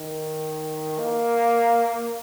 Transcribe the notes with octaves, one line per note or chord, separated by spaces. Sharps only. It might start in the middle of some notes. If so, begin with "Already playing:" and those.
Already playing: D#3
A#3